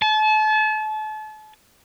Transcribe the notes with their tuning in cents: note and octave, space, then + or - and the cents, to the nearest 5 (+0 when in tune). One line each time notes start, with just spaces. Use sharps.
A5 -35